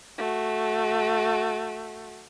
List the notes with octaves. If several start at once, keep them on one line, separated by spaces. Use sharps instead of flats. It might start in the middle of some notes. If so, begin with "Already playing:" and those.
A3 F#4